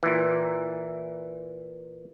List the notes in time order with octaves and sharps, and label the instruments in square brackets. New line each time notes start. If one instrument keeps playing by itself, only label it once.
[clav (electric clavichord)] A#2 E3